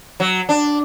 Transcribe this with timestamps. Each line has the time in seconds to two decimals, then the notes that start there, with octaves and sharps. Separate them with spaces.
0.20 F#3
0.49 D4